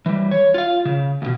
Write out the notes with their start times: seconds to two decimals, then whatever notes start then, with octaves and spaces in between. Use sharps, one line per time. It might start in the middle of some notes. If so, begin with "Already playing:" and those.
0.06 E3 G3
0.31 C#5
0.54 F4 F5
0.85 C#3
1.22 D2 B2